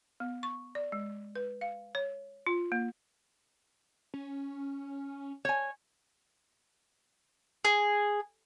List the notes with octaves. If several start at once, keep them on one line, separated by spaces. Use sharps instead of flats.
B3
C#6
D5
G#3
B4
F5
C#5
F4
A#3
C#4
C#5 G#5
G#4